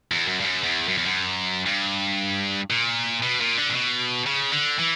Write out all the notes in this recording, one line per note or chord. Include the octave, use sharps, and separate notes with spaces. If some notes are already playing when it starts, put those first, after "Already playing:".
E2
F#2
G2
F#2
E2
F#2
E2
F#2
G2
A#2
B2
A#2
D3
A#2
B2
C#3
D3
E3